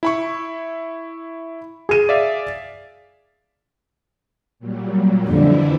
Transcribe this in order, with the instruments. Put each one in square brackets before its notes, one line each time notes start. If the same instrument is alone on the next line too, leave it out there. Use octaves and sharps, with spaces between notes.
[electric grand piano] E4 B5 C#6
[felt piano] G#4 D#7
[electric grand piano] D5 E5 F5
[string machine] A#2 F#3 G3
[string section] F2 D3 [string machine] E3 F3 E4